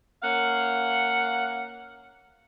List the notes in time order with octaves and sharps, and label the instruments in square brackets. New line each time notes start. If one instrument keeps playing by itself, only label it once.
[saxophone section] A#3 C#4 F5 F#5